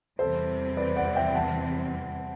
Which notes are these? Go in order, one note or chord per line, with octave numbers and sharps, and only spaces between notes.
E2 C3 E3 G3 C4 A4 C5
B4 D5
D5 F#5
E5 G5
F#5 A5